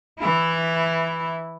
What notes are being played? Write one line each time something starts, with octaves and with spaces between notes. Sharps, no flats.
E3 E4